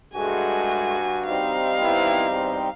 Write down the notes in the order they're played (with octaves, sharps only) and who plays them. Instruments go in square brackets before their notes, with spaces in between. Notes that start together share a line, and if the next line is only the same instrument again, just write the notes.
[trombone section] G2 F#4 [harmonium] G#3 A3 [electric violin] G#5
[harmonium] G3 C4 D#4 [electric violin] F5
[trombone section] B3 E4
E2